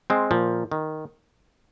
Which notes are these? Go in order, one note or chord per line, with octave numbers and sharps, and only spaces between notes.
G#3 C4
A#2 F3
D#3